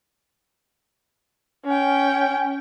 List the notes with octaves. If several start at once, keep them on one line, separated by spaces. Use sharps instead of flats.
C#4 G5